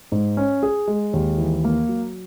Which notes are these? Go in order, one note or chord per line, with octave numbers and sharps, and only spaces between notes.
G#2
C#4
G#4
G#3
D#2
E3
A#3
F#3